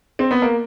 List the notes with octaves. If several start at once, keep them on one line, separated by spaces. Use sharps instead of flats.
C4
B3
A#3